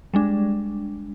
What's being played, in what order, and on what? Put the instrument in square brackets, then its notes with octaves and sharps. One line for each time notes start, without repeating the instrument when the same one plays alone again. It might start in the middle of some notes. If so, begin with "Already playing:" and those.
[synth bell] G3 G#3 D4